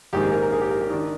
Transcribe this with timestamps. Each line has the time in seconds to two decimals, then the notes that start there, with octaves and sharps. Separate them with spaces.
0.13 A#1 G#2 D#3 G4
0.23 G#4
0.32 A#4
0.42 A#4
0.52 G#4
0.61 G4
0.71 A#4
0.81 G4
0.90 D#3 D4